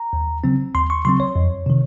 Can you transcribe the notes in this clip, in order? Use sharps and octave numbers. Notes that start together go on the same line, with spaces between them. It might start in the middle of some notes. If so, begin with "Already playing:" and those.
Already playing: A#5
D#2
C#3 F#3 C4
D#2 C6
C#6
C#3 F#3 C4 C6
C#5
F2
C3 D#3